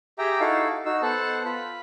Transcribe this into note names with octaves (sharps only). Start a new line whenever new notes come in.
G4 G#4 E5 G5 A#5
D#4 E4 F#4 A4 F5
D#4 F#4 E6
B3 A4 C5 F#5 A5
F4 B5